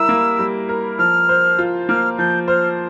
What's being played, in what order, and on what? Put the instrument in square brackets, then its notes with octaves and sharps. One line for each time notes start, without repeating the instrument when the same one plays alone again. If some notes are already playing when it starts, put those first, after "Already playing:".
Already playing: [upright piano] G3 E4 A#4 [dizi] E6
[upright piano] A#3
G3
A#4
[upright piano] F3 [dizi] F6
[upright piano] C5
F4
[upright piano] A#3 [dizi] F6
[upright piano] F3 [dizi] G6
[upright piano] C5 [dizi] F6